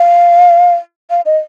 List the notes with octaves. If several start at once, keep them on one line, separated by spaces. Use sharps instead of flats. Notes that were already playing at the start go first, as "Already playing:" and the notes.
Already playing: F5
F5
D#5